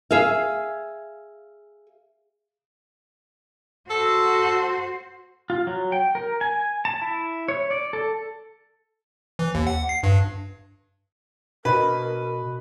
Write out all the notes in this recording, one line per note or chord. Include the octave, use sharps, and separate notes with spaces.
G#4 E5 F5
F#4 A4 C5
F4
F#3
G5
A#4
G#5
A5
E4
C#5
D5
A4
E3
D#2
F#5
C7
G2
B2 D4 F#4 A#4 B4 D#5